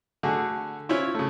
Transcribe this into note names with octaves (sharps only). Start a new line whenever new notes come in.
D3 A3 F#4 G#4
C#4 E4 F4 C5 C#5
C#3 A3